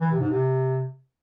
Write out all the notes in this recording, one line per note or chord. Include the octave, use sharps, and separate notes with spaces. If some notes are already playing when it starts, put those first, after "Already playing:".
E3
C3
G#2
C3